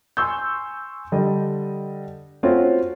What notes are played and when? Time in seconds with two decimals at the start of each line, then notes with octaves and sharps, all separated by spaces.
0.17 G#5 C6 C#6 E6 G6
1.12 D3 G3 D#5
2.43 A3 C4 C#4 F4 F#4